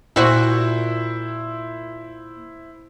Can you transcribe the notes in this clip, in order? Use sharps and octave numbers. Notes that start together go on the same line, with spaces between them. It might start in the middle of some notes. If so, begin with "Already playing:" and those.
A#2 E4 F#4 C5